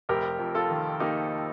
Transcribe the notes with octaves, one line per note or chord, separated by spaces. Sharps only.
F1 G4 A#4
F2
F4 A4
D#3
A#3 D#4 G4